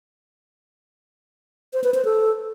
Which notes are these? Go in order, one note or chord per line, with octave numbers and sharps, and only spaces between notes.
C5
B4
C5
A4